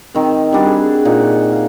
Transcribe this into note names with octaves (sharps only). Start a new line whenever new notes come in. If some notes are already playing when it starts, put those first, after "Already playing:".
D#3 C4
G3 D4 F#4
G#4
A#2 D#4 F#5
F5